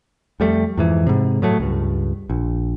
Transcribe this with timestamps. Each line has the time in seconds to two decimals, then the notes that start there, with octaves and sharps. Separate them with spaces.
0.40 F2 G3 A3
0.77 F2 G#2 E3
1.07 G#2 C3
1.42 A2 F#3 A3
1.60 C#2 G2
2.30 A#1